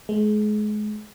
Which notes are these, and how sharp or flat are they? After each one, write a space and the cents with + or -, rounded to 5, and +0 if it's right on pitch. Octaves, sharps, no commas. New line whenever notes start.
G#3 +30